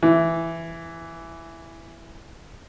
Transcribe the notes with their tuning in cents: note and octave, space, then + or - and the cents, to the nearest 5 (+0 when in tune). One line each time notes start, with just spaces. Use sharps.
E3 +5